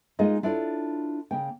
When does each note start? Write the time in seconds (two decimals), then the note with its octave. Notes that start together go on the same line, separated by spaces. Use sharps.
0.19 G#3 A#3 D#4 F4 G#4 D#5
0.43 D4 E4 F4 A4 C#5 D5
1.31 C#3 A#3 G5